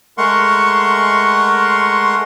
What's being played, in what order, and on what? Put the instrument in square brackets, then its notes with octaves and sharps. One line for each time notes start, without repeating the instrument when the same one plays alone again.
[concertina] G#3 A3 A#4 F#5 C6 C#6